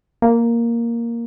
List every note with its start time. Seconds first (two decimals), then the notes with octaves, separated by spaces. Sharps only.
0.22 A#3